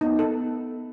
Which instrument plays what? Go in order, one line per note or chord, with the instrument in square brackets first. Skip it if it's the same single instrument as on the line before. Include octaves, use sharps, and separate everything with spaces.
[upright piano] B3 [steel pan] D#4
[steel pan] A4